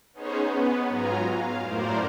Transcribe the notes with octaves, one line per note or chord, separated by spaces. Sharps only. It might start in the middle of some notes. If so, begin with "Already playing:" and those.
B3 C#4 D#4 G#4 C5 C#5
B3
G#2 F#3 F4 G#5 A#5
F5
F#2 A2 A#4 C5 D5